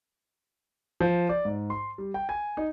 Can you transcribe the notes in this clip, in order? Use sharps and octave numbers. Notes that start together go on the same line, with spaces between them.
F3
D5
G#2
C6
G3
G5
G#5
D#4